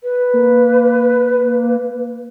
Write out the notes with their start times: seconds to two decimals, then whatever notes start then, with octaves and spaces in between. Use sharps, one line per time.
0.03 B4
0.33 A#3